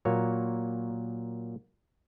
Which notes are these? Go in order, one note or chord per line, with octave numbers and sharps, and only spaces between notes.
A#2 F#3 A#3 C#5